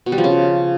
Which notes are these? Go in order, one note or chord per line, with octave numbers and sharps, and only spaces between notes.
B2
G3
F3
C#3